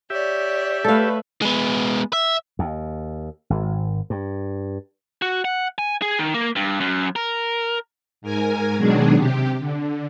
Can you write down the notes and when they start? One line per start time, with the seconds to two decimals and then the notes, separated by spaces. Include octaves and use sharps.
0.10 G4 C#5 D5 E5
0.84 A3 A4 B4 F5
1.42 G#3 B3
2.13 E5
2.59 D#2
3.50 G#1
4.10 G2
5.22 F#4
5.45 F#5
5.79 G#5
6.02 G#4
6.19 D#3
6.34 A#3
6.56 G2
6.80 F#2
7.16 A#4
8.22 G#2 A#4 G#5
8.77 B2 D#3 F#3 G#3 D4 G#4
9.17 C3 G4
9.59 D3